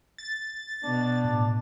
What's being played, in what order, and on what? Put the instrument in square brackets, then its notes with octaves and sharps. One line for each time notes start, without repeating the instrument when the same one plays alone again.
[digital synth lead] A6
[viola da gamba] B2 [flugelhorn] D4
[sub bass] A2